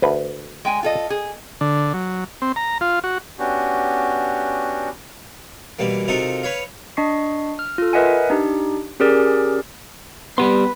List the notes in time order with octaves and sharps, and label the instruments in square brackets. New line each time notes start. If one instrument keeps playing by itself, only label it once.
[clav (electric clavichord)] D2 B4
[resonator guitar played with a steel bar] G#3 G5 G#5
F4 A4 D#5
G#4
[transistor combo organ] D3
F#3
C4
A#5
F4
F#4
[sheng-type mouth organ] B3 C#4 D4 F#4 G4
[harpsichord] B2 E3 G3 A#3
C3 D#4 F4 F#4 A4 A#4
B4 C#5 F5
[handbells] D4 D#5 C#6 C7
F6
F4 A4
A#4 B4 D#5 E5 F#5 G#5
D4 D#4 G4
C#4 G4 G#4 A#4 D5
[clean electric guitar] G3 G4 C6 [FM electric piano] B3 [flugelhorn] B4